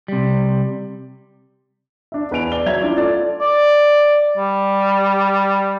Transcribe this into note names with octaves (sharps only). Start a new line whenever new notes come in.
C3 G3
D4 E5
E2 B4 G#5 D7 F7
D5 G7
F#3 E5 G#6 F7
C#4 D4 E4 F4 D5
F4 A4 D5
D5
G3